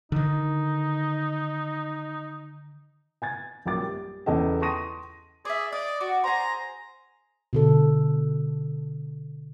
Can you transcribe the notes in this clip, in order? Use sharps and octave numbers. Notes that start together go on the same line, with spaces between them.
D3 D#3 D#4
G#5 G#6 A6
A#1 F#2 A#3 G5 D6 A6
G3
E2 C#3 A4 D#5 G5 A5
A5 C6 C#6 D#6 A#6 D#7
G#4 D5 E5
D5 D#5
F#4 D5
G#4 C5 A#5
B2 D3 A4